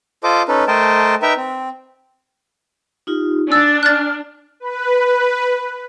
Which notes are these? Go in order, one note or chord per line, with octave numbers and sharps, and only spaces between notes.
F4 A4 C5 D#5 D6
C#4 D#4 A4 B4
A3 A#4 C5 D#5 G5 A5
D#4 B4 E5 G5 A#5
C4
D#4 F4 G4
D4 G#5 E6 A6
F6 F#6 A6
B4